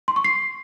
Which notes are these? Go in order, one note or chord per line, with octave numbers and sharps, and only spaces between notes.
C6
C#6
C7